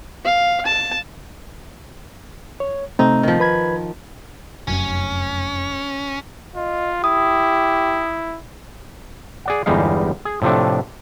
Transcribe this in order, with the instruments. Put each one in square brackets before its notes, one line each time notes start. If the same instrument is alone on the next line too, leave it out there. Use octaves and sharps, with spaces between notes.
[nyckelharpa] F5
A5
[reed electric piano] C#5
[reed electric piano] C3 A3 C4 [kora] D#4
[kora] D#3 F3
[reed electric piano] B4 B5 G#6
[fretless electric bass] F1 F#2 [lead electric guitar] C#4
[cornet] F4 [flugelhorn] D#5
[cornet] E4 [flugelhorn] G4 [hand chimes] D#6
[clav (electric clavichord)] G#4 D5 F#5
G1 E2 G3 G#3 D#4 F5
G#4
A2 C3 F3 A3 D4